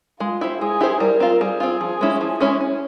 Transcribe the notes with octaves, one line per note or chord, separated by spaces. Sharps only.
G#3 F4
E4 G4 C5
G#3 G#4
E4 G4 C5
G3 A#4
C4 F4
G3 G#4
C4 F4
F3
G#3 C#4 E4
F3
G#3 C#4 E4
C#4